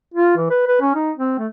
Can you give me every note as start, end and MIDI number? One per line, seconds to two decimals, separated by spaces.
0.14 0.37 65
0.37 0.49 52
0.50 0.63 71
0.67 0.78 71
0.81 0.94 61
0.95 1.11 63
1.17 1.34 60
1.38 1.47 57